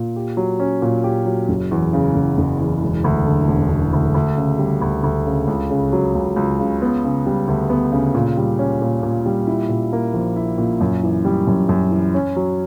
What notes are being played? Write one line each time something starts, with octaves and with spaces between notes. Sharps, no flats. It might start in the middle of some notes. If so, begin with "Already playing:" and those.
Already playing: A#2
G4
F#3
C#4
A#2
G4
F#3
F#1
E2
C#3
F#1
F#1
E2
E1
D2
D3
E1
E1
D2
D2
C#3
G3
D2
D2
C#3
C#2
C#3
F#3
C#2
C#2
C#3
B3
C#3
G3
D2
B3
C#3
A#2
G3
C#4
A#2
A#2
G3
E4
A#2
A#3
A#1
E4
A#2
F#2
E3
G3
F#2
F#2
E3
C#4
F#3